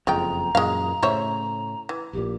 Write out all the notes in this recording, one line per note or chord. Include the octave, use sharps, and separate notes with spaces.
F#1 F2 G#3 F4 G5 A#5
F#2 A#2 E3 G#3 F5
A2 C#3 C5 C#5 E5
E3
A#1 A#2 G4